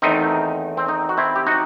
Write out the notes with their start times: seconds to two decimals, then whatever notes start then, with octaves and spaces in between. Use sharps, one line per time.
0.02 E2 D#3 A3 C4 D#4
0.77 C4
0.88 D#4
1.09 F#4
1.17 C4 E4
1.36 G4
1.47 D#4 F#4